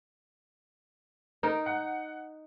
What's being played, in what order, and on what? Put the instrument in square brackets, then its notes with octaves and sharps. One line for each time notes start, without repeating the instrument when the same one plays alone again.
[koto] D#4 [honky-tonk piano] A#4
[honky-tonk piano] F#5